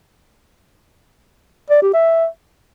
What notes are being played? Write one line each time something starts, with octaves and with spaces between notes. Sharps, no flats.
D5
G4
E5